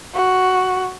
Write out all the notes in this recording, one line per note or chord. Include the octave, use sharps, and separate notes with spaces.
F#4